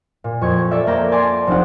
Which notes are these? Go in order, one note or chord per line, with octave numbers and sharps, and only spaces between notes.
A#2
F2 C#6 G#6
A4 D5 E5
A#3 G5 A#5 G6
D5 G#5 A5 C6 D6
F1 C4 D4 F4 F#5